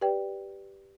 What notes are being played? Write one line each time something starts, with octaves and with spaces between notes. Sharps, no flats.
G4 B4 D5 G5